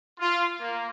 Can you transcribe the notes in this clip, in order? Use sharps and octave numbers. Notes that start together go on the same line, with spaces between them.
F4
A#3